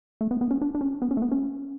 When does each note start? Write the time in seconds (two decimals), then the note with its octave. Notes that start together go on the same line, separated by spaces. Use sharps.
0.21 A3
0.31 B3
0.41 B3
0.51 C#4
0.61 D4
0.75 D4
0.81 C#4
1.02 B3
1.11 C#4
1.17 A3
1.22 B3
1.32 C#4